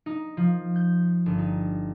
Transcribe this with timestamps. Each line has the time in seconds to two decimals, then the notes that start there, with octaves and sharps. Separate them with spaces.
0.06 D#4
0.37 F3
0.76 G6
1.26 G1
1.38 D#4